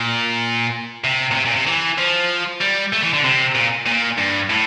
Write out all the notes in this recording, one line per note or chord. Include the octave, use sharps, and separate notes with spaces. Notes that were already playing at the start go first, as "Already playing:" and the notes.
Already playing: A#2
C3
A#2
C3
A#2
C3
E3
F3
G3
A3
E3
D3
C3
A#2
A#2
G2
A2